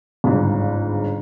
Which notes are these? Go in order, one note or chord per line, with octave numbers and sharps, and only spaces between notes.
G1 C#2 G#2